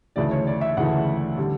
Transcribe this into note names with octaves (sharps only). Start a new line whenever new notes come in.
D2 C#3 E3 A3 D5
C#5
D5
E5
D2 C#3 E3 A3 F#5
D3 G3